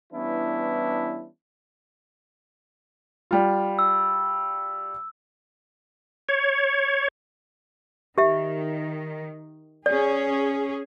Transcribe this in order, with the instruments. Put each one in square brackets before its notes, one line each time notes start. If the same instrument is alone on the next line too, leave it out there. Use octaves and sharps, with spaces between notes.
[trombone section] E3 G3 B3 C#4 D4 E4
[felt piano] G3 F4
[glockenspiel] E6
[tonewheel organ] C#5
[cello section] D#3 [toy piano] G4 E5
[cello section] C#4 G#4 [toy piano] D5